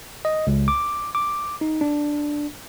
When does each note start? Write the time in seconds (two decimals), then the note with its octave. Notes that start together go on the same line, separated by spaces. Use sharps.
0.25 D#5
0.47 C#2
0.68 D6
1.15 D6
1.61 D#4
1.81 D4